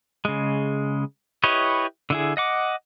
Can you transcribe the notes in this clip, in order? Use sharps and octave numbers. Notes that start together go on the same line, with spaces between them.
C#3 G#3
E4 G4 B4 C#5 D#5
D3 E4 G#4
D#5 F#5 D6